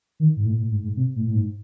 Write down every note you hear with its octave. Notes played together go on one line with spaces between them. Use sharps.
D#3
G#2
A2
A2
G#2
G#2
C3
A2
A2
G#2